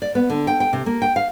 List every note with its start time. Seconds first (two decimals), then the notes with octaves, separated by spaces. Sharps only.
0.02 D5
0.15 B3
0.30 D3
0.47 G5
0.60 G5
0.73 C3
0.86 A#3
1.02 G5
1.16 F5